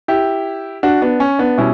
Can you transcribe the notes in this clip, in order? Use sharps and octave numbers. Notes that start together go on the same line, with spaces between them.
E4 G4
D4 F#4
B3 D4
C#4
B3 D4
B2 G3 C#4 E4